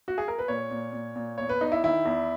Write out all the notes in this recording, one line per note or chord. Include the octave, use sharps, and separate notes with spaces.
F#4
G#4
A#4
B4
A#2 C#5
A#2
A#2
A#2
E2 C#5
B4
E2 D#4
E4
D#3 E4
E2